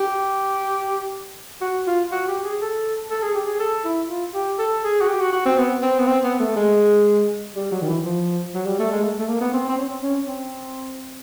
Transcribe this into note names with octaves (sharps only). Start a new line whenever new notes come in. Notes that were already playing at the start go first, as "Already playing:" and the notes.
Already playing: G4
F#4
F4
F#4
G4
G#4
A4
A4
G#4
G4
G#4
A4
E4
F4
G4
A4
G#4
F#4
G4
F#4
F#4
C4
B3
C4
B3
C4
B3
A3
G#3
G3
F#3
D#3
E3
F3
F#3
G3
A3
G#3
A3
A3
A#3
B3
C4
C4
C#4
C4
C#4
C4